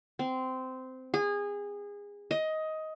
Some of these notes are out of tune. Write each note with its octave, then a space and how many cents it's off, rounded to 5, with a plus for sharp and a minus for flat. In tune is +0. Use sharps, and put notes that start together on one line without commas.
C4 -15
G#4 -25
D#5 +15